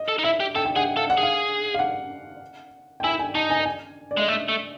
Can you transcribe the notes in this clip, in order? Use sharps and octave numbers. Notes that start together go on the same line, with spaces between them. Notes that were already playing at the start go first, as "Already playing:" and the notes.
Already playing: D#5
A4
D#4
E4 E5
G4
A4 G5
G5
G#4 F#5
A4 F5
F#5
G#4
F5
F5
F#5
G5
E4 G#5
G#5
D#4 A5
G#5
G#5
D5
G#3 D#5
A3 E5
A3